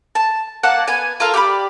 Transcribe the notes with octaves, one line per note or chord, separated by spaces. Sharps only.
A5
A#3 D5 F#5 A5
B3 G#5
F4 A4 A#4 F5
G4 D5 F#5 B5